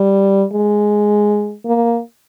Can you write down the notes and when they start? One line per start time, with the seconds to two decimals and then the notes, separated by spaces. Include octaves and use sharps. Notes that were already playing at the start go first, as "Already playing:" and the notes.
Already playing: G3
0.53 G#3
1.66 A#3